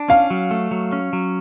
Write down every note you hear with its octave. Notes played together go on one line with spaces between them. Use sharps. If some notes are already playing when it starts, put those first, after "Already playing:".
Already playing: D4
C#4 F5
F#3
A3
F#3
C#4
F#3